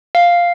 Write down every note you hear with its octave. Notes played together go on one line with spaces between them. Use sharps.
F5